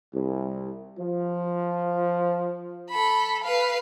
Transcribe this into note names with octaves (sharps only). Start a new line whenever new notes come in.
C2
F3
A4 B5
B4 F5